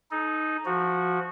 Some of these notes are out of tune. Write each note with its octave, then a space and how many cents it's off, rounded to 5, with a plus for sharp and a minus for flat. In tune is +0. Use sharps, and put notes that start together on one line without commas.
D#4 +0 A4 -40
F3 +0 F#4 -15